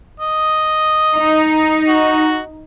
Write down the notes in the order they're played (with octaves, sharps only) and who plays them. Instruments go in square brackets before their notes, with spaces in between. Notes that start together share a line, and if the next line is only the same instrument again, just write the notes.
[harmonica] D#5
[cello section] D#4
[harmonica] F#4